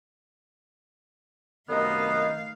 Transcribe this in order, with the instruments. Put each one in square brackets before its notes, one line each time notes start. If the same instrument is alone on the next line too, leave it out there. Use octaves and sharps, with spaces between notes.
[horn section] F#2 C3 D#5 [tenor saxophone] D#3 [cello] A3 F5 [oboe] B3